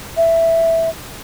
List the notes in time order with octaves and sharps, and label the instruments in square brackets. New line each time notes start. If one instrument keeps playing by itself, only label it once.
[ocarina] E5